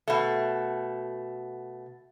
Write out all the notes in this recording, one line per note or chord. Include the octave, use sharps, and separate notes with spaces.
B2 A3